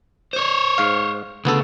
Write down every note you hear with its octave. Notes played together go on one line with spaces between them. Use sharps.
C5 C#5
G#2 F5
D2 C#3 B3 A4